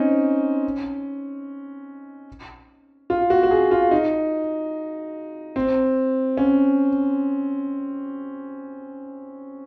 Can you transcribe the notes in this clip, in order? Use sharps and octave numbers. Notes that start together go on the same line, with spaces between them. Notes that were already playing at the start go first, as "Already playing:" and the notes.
Already playing: C4 C#4 D#4
F4
F#4
F#4
G#4
F4
D#4
C4
C#4